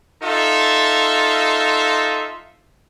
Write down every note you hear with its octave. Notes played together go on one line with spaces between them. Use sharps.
D#4 F4 A4 E5